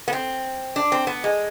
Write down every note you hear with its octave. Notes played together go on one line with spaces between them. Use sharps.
B3
C4
D4
C4
B3
G#3